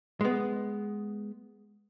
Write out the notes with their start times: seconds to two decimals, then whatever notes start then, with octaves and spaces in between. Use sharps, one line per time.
0.21 G#3 B3